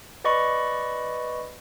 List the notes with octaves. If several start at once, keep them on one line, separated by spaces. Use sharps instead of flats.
B4 D5 D#5 B5 C#6